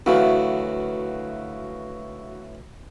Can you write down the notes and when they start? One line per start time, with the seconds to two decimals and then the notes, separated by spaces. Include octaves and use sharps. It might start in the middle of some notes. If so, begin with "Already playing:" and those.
0.06 D2 E3 F#3 F#4 E5 F5